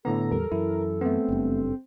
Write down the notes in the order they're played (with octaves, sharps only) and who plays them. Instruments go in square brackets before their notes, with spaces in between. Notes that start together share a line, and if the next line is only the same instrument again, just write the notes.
[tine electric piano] A2 D3 B3 [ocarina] A4 [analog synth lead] A#5
[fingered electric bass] E2 G3 [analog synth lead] A#4
[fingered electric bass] F#2 E3 [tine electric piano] E4
[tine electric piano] A3 B3 [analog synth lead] C4
[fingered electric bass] F#1 G2